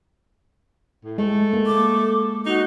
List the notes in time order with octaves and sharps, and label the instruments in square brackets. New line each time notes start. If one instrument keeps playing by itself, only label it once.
[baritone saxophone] A2
[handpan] G#3 [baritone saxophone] A3
[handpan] A#3
[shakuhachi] D6
[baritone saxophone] D#4 [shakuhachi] F#4